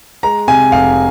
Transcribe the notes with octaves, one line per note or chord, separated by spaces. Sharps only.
G#3 A#5
C3 G#5
F1 F5